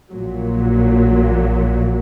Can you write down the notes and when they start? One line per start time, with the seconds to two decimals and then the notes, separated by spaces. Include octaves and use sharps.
0.12 A#1 A#2 F#3